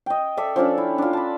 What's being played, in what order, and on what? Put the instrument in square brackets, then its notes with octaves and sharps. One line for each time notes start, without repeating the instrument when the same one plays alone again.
[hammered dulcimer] D#5 G5
A4 D5 E5
F3 C#4 D4 A4
E4
D4 F4
A5 B5